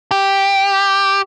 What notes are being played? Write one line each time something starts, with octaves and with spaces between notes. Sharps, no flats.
G4